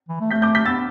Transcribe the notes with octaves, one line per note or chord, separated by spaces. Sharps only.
E3
A3
A3 G6 B6
D6 G6
G6 B6
B3 E6 A6